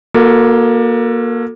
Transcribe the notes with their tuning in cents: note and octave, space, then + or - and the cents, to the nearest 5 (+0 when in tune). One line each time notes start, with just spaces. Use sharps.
A#3 +20 F#4 -25 A4 +30